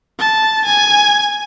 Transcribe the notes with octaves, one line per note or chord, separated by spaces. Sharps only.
A5
G#5